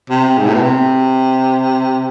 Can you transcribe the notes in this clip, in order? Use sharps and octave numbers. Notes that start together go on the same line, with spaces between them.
C3
G#2
A2
B2
C3